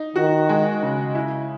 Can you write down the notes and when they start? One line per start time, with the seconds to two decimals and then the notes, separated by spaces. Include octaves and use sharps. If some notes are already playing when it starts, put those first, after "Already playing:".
Already playing: D#4
0.16 D#3 F#4
0.49 G#3
0.83 C#3
1.15 E4